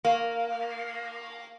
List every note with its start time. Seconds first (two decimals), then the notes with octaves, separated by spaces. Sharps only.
0.05 A#3